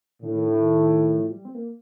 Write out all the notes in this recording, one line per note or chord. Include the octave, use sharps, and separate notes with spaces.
A2 D3
D#3
D3
D#3
F3
G3
C4
A#3